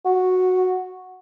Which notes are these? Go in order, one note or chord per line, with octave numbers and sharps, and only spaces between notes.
F#4